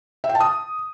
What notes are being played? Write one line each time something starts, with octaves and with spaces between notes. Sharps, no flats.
E5
G5
A5
D#6